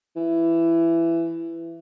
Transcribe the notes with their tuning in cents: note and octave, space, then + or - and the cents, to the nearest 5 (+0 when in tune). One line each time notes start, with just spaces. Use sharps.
E3 +15